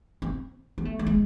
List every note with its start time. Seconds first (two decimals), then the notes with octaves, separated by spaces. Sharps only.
0.22 C4
0.78 B3
0.85 A3
0.99 A3
1.07 G#3